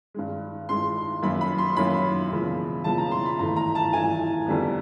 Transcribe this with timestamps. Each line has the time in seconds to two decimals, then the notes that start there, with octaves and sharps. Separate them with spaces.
0.14 G2 D#3 G#3
0.69 G2 D#3 G#3 C6
1.23 F#2 D#3 F#3 A#3 B5
1.41 B5
1.58 C6
1.77 F#2 D#3 F#3 A#3 B5
2.31 E1 E2 C#3 F3 A#3
2.84 E1 E2 C#3 F3 A#3 A5
2.98 A#5
3.11 C6
3.26 B5
3.39 G#1 G2 E3 A3 A#5
3.56 A#5
3.75 A5
3.93 G#1 G2 E3 A3 G#5
4.46 F2 D3 G3 B3